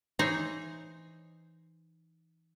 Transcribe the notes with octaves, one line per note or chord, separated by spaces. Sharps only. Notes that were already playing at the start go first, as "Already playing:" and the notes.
E3 D#4 C5 C#5